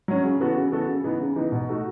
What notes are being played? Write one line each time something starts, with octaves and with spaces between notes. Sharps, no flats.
F#3 C#4
C#3
E3 B3 F#4 A4
C#3
E3 B3 F#4 A4
C#3
E3 B3 D#4
C#3
E3 B3 D#4
B2
A3 D#4 F#4